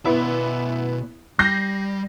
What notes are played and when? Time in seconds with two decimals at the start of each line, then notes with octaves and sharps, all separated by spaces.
0.05 B2 B3 E4 D5
1.39 G3 G6 A#6 C7